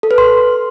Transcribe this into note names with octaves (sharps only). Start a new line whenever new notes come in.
A4
B4
C6